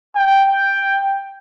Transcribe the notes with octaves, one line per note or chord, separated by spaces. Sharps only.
G5